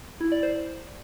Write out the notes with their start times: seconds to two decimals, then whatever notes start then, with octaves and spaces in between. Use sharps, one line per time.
0.20 E4
0.32 D5
0.43 C5